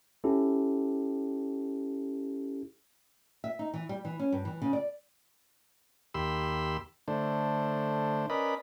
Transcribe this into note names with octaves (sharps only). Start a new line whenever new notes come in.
C#4 E4 G4 A4
E5
D#4
E3
G3
E3
C#4
G2
E3
C#3
D5
D#2 G4 B5 C6 E6
D3 A3 D4 C5
C#4 A#4 B4 D5 D#5 B5